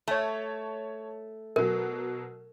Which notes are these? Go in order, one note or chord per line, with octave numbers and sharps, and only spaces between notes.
A3 C#5 A5
B2 F#3 A#4